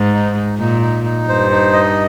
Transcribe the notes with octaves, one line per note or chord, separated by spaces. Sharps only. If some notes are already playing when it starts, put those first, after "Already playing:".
Already playing: G#2
D#4
D#4
A#2 D#4
D#4
D#4
G2 C5
D#4
D#5